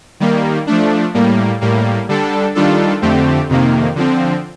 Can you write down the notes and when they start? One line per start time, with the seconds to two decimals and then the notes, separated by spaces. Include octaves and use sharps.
0.20 D#3 G3 A#3
0.67 F3 A3 D4
1.14 A2 G3 A#3
1.61 A2 G3 A#3
2.09 D3 G3 D4 A4
2.55 D#3 G3 D4 F4 A4
3.02 F2 D3 A3 C4 G4
3.49 F2 C3 D#3 A#3
3.96 D3 F3 C4